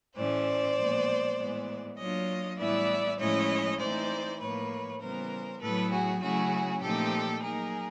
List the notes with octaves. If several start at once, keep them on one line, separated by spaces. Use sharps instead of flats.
A2 E3 A3 C#4 C5 D5
A#2 F3 G#3 B3
A2 E3 G#3 B3
F#3 A#3 D4 F4 C#5 D#5
A2 E3 G3 B3 E4 D5 E5
A2 F3 G#3 C#4 E4 C#5 D#5
E3 A3 C4 D#4 C5 D5
A2 F3 A#3 B4 C#5
C#3 E3 G3 B3 A#4 C5
A2 F#3 B3 E4 A4 B4
F#4 G#4
C#3 F#3 A3 C#4 E4 F#4 G#4
A#2 F3 A3 C4 D#4 G4 A4
F#3 A#3 D#4 G#4 A#4